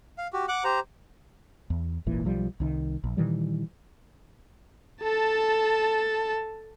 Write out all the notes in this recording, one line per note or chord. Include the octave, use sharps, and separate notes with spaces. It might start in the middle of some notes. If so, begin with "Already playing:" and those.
F5
F#4 G4
F#5 D6 F#6
G4 C5 A#5
E2
D#1 G#1 A#2 E3
B1 F3 G3
C2 D#3
A#1
A#2 D#3 E3 G3
A4 A5